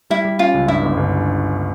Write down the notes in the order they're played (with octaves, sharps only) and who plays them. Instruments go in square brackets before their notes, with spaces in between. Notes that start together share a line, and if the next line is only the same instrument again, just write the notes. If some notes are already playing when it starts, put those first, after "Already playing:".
[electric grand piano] G3 [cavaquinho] E4
[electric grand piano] G3
[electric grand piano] C#4 [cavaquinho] F4
[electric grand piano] C#2
[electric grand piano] G2 [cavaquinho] E4
[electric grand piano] G1
G1